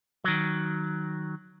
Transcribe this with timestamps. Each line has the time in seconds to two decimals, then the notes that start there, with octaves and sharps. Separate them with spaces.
0.24 D#3 F#3